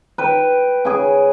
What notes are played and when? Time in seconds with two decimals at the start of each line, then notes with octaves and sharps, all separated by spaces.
0.18 B4 G5
0.85 C#3 G#4